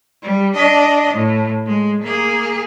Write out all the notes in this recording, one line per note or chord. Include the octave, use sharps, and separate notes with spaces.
G3
D4 D#5
A2
G#3
A#3 G#4